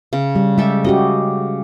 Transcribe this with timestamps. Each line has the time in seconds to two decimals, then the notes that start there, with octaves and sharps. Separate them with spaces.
0.13 C#3
0.36 G3
0.58 G#3 G4 A4 E5
0.84 C#4 F#4 G4 D#5